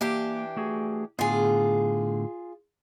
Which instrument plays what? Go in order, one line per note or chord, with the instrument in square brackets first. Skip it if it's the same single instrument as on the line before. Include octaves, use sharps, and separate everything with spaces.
[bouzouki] E3 D4 G4 [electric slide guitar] A#3
[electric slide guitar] A3 F#4 G#4
[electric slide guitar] A2 D3 B3 [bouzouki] F4 G#4